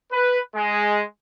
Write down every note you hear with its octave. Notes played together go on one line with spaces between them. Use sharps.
B4
G#3